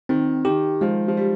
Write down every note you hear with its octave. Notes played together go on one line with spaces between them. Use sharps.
D#3 C4
D#3 G4
F3 G#3
F3
G3